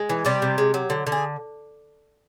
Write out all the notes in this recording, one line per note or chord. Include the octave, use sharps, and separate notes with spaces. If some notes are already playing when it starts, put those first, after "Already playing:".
Already playing: G#3
E3
C3 G3 G4
C3
G#3
F#3
D3
D3
G#4